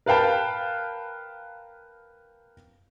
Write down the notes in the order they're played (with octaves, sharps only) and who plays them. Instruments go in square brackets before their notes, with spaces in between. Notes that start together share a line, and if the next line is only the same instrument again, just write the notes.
[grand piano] A#4 B4 F5 G5 A5